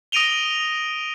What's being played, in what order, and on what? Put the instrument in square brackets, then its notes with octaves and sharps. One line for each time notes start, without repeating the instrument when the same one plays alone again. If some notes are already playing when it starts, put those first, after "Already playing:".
[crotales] D#6 A#6 D7 D#7 F7 G7